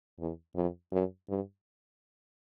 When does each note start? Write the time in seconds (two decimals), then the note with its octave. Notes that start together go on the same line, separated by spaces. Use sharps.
0.19 E2
0.55 F2
0.92 F#2
1.29 G2